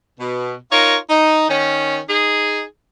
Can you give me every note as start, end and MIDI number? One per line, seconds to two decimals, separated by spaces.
0.18 0.53 47
0.71 0.96 63
0.71 0.96 65
0.71 0.96 70
0.71 0.96 73
1.08 1.45 63
1.48 1.98 51
1.48 1.98 61
2.08 2.61 63
2.08 2.61 68